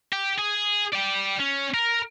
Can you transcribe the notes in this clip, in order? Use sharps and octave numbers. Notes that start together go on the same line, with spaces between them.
G4
G#4
D5 G5
C#4
A#4